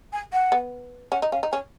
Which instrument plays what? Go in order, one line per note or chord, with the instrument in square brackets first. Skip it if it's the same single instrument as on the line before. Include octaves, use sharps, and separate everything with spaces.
[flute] G#5
F#5
[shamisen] B3
[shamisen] C#4 [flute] F#5
[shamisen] D#4
[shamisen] C#4 [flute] F5
[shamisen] D#4
[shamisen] C#4 [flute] G#5